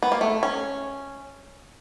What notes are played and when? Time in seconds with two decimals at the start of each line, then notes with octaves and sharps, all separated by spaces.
0.02 B3
0.12 A#3
0.21 A3
0.43 C#4